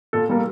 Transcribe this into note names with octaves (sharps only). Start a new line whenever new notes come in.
A#2 A4
G3 A#3